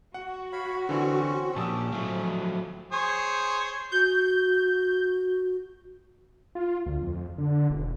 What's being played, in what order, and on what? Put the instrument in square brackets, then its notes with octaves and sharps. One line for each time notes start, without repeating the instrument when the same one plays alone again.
[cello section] F#4 [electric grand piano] F#5
[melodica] C#5 F5 B5
[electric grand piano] D3 E3 [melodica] C4 C#4
[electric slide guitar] A#2 F3 [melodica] C#4 [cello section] G4 [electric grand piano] A5 D#6 E6
[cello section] A2 F3 [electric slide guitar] F#3 A3
[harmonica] G#4 C5 C#5
[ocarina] F#4 [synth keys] G6
[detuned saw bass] F4
D2
F2
D3
E1